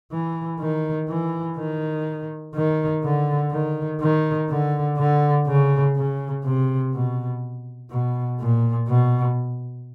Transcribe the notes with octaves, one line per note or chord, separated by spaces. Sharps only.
E3
D#3
E3
D#3
D#3
D3
D#3
D#3
D3
D3
C#3
C#3
C3
B2
B2
A#2
B2